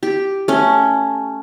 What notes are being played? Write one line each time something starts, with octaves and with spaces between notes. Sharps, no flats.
G4
A3 C#4